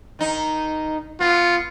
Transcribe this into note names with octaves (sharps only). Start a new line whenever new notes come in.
D#3 D#4
B3 F4